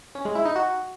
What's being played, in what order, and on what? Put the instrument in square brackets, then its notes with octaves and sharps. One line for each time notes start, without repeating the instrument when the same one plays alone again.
[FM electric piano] C#4
G#3
E4
D#4
F#4